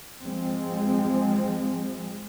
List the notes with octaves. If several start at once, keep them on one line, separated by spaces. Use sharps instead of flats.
F3 G#3 C4